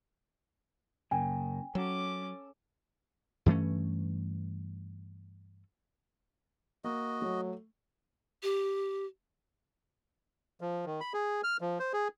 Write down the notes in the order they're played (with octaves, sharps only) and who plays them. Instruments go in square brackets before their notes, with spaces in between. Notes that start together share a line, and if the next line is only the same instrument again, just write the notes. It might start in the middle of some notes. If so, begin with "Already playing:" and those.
[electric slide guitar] F#2 C#3 A#3 [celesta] G5 G#5
[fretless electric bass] F#3 [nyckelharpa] C#4 D6 [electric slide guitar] A4
[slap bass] G2 E3 A3 C#4
[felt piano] A#3 [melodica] F#4 D#5
[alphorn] F#3 [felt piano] A3
[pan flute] G4
[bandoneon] F3
D#3
B5
G#4
F6
F3
C5
G#4